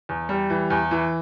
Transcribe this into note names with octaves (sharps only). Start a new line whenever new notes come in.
E2
G3
E3
E2
E3